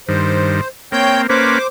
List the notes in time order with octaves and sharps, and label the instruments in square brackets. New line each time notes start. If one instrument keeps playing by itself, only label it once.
[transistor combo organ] G2 D#3 [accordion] C5
[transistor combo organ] A#3 C4 [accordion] C#5 G5 G6
[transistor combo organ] A#3 C#4 B4 [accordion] C5 D6